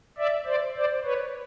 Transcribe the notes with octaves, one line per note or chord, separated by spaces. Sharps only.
D5 E5
C5 D5
C5 D5
B4 C#5